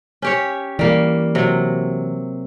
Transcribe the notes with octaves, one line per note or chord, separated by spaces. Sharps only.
C#4 G4 C#5
E3 G3 A#3
C3 F#3